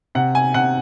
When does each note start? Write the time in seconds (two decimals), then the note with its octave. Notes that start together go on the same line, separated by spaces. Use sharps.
0.15 C3 F#5
0.35 G#5
0.54 C3 F#5